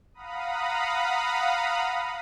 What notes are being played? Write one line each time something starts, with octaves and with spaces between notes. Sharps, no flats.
F5 F#5 A#5 B5 D#6